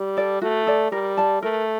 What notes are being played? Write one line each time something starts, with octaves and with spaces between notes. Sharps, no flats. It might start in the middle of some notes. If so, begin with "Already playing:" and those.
Already playing: G3
A4 D5
A3 F#4
A4 D5
G3 A#4
D5 A5
A3 A#4